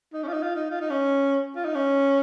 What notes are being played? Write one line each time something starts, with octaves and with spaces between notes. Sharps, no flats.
D#4
C#4
F4
D#4
F4
D#4
F4
D#4
C#4
F4
D#4
C#4